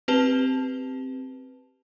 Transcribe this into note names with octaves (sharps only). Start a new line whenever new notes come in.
C4 G4 B4 A5 F7 G7